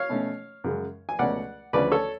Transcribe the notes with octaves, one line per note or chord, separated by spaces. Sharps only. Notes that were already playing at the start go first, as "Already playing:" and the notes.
Already playing: C#5 F5
B2 A3 C#4
F#2 C#3 G#3
G#5
C#2 B2 A3 C#4 D5 F#5
D2 C#3 F3 A3 C#4 B4 D5
A4 C#5